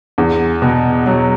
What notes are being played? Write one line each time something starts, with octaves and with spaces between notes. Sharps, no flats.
E2
B2
F#3